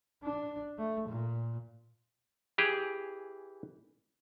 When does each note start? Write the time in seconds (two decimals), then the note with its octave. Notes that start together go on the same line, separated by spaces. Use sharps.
0.24 D4
0.78 A3
1.08 A#2
2.58 E3 G4 G#4